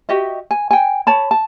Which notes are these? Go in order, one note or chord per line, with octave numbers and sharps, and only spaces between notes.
F#4 G4 D#5 E5
G#5
G5 G#5
C#5 A5 B5
A5